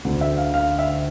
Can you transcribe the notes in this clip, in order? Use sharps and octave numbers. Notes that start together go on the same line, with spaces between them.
D2 D3 A3
E5
F5
F5
E5